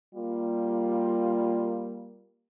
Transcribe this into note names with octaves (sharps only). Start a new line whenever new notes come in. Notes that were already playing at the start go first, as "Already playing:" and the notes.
G3 A#3 F4